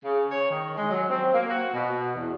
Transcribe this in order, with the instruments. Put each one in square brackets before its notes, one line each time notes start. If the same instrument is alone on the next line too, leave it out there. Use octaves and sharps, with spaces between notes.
[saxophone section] C#3
C#5
D#3
G#3
F#3
C4
A#3
F#4
B2
E2